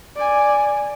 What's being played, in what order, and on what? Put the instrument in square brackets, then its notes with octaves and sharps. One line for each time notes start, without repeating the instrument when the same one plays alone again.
[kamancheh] D5 G#5